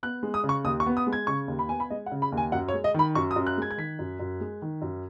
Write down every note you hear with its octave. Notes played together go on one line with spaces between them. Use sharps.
B3 F#6
G#3
D#6
C#3
C#6
D#2 D#6
C#6
B3
D#6
G#3
G#6
C#3 C#6
D#2
B5
B3 G#5
B5
G#3 D#5
F#5
C#3
B5
D#2
G#5
F#2 F#5
C#5
G#3
D#5
D#3 B5
F#2 C#6
D#6
F#2
F#6
G#3 G#6
G#6
D#3 B6
F#2
F#2
G#3
D#3
F#2